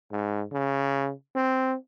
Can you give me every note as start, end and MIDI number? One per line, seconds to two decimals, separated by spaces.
0.12 0.44 44
0.52 1.12 49
1.35 1.76 60